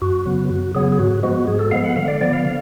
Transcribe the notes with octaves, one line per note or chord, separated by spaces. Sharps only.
F#2 F#4
C#3 F#3 B3
F#2 F#4
C#3 F#3 B3 G#4
G#4
G#2 F#4
F3 G#3 B3 F#4
G#2 G#4
A4
F3 G#3 B3 F5
F#5
D3 F5
D5
F3 B3 D5
F5
D3 F5